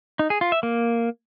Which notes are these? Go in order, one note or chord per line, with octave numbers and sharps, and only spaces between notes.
D#4
G#4
F4
E5
A#3